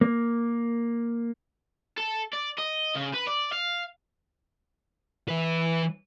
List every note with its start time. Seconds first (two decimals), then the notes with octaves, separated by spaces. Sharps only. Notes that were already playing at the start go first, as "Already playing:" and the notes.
0.01 A#3
1.98 A4
2.33 D5
2.58 D#5
2.95 C#3
3.14 B4
3.27 D5
3.52 F5
5.29 E3 B4